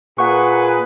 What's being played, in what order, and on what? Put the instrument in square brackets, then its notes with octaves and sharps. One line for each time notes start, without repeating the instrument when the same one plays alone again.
[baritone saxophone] A#2 [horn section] G#4 A#4 B4 [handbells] F#5 C#6